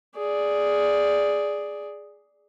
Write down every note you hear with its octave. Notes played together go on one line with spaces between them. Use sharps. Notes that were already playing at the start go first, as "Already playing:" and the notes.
G#4 D5